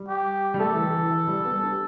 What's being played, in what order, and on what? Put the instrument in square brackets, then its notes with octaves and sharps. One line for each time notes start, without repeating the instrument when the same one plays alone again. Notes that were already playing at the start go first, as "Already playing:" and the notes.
Already playing: [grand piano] G3
[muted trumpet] G4
[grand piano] G3
[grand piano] A3 [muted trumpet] A4
[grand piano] E3
E3
E3
E3
G3
B3
D4
G4